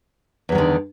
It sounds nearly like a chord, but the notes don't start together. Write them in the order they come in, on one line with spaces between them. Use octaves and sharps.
E2 F#3 D#3 D3